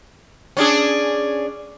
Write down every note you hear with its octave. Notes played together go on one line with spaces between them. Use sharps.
C#4 D4 G#4